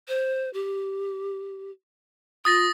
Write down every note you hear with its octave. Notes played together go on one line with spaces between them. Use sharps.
C5
G4
F4 D#6 A6 A#6